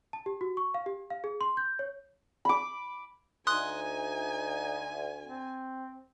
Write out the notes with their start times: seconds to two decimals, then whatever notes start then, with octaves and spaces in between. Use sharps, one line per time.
0.13 A5
0.26 G4
0.41 F#4
0.57 C#6
0.74 F5
0.86 G4
1.10 F5
1.24 G#4
1.41 C6
1.57 G6
1.79 C#5
2.45 B5 D6
3.47 D2 D#4 G#5 C6 D#6 F#6
5.25 C4